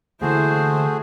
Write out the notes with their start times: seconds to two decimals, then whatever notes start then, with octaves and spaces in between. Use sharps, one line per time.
0.22 D3 E3 A3 A#3 E4 F#4 G#4 C5